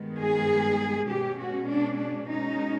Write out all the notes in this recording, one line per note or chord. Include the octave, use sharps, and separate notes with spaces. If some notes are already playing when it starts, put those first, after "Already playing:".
Already playing: G2 D#3 G#3 B3
G#4
B2 G#3 C#4 G4
F#4
D4
D4
B2 G#3 C#4 D#4